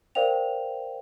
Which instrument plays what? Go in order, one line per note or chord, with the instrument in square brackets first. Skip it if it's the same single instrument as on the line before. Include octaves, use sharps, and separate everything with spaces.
[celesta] A#4 C5 D5 F5 G5 F7